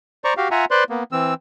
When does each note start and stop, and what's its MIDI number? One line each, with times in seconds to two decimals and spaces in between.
0.24 0.34 72
0.24 0.34 74
0.24 0.34 82
0.24 0.34 85
0.37 0.48 66
0.37 0.48 67
0.37 0.48 77
0.51 0.65 65
0.51 0.65 76
0.51 0.65 78
0.51 0.65 80
0.51 0.65 82
0.71 0.84 71
0.71 0.84 72
0.71 0.84 74
0.71 0.84 84
0.71 0.84 90
0.90 1.03 58
0.90 1.03 59
1.12 1.34 52
1.12 1.34 60
1.12 1.34 88